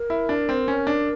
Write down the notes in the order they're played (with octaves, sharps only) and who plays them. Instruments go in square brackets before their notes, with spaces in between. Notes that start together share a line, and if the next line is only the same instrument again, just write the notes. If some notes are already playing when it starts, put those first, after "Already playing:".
Already playing: [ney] A#4
[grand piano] E4
D4
C4
C#4
D4